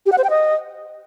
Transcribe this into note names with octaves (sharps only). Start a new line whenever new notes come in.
G4
F#5
C5
G5
D#5